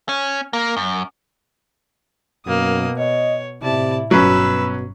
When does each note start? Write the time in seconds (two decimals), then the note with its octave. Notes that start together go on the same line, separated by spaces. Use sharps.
0.09 C#4
0.53 A#3
0.77 F#2
2.46 F#2 B2 A#3 D#6
2.98 C#5 D#5
3.63 A2 C3 E4 D5 A5
4.11 G1 B2 F#3 C#4 B4 E6